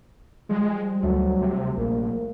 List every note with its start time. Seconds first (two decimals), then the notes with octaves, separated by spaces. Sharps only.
0.49 F3 G3 G#3
1.03 D2 F#3 A3
1.41 C3
1.77 A#1 A#3